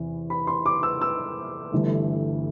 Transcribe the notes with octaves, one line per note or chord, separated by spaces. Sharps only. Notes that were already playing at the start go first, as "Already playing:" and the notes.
Already playing: E2 C3 E3
B5
C6
D6
E6
E6
G1 G2 E3 A3